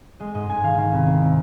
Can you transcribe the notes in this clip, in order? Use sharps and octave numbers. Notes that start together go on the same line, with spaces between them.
G#3 D#5
G#2 D#5
G#2 G#5
D#3 F5
D#3 F5
C2
C2
C3